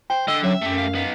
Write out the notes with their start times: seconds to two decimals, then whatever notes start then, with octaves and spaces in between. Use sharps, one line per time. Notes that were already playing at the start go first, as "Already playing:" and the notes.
0.10 C5 G5
0.28 D3 D#5 E6
0.43 F#3 C#4 E5
0.62 F#2 A3 G4
0.78 F5
0.95 B3 D#4 F5